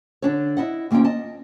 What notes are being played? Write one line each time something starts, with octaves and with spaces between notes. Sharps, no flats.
D3 D4 C#5
E4 D#5 F#5
D2 A#3 C#4 F4 G5
D#5 A5